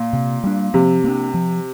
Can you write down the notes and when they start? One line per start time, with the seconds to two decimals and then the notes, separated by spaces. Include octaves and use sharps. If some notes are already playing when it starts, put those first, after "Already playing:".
Already playing: A#2
0.13 C3
0.44 G3 D4
0.74 C3 F3
1.04 A#3 D4
1.34 F3